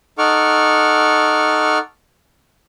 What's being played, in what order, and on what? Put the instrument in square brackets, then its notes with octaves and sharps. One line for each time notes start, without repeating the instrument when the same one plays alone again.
[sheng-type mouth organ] D#4 A4 F#5 C#6 D6 F6